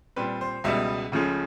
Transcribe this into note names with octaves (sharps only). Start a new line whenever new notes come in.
A#2 G3 C4 B4
C5
C#2 B2 G3 B3 E5
C#2 C#3 F3 A3 C#4